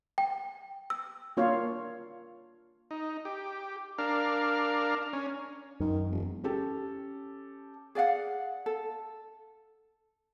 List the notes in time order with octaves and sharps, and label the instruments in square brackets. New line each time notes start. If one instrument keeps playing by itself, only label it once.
[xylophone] G5
E6
[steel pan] A#3 D4 F4 C#5 F5
[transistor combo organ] D#4
G4
D4 A#4 F5
C#4
[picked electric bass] F#2 [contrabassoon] D#3
[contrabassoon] E1
[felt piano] C#4 G4 A4
[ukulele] G#4 D5 F5 F#5
A4